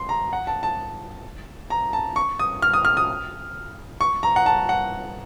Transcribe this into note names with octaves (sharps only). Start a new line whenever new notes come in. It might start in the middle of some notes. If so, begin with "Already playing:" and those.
Already playing: C6
A#5
F#5
A5
A5
A#5
A5
C#6
D#6
F6
D#6
F6
D#6
C#6
A#5
F#5
A5
F#5